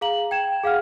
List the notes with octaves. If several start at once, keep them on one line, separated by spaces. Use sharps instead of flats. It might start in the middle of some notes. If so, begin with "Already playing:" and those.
G#4 F5 A#5 F#7
G5 G#6 E7
G#4 F5 F#5 F6